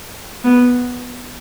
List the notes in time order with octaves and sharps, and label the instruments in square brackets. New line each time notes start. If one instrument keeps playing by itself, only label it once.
[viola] B3